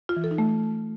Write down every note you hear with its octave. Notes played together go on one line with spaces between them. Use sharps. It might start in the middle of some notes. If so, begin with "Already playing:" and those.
F4
E3
A4
D#4
A3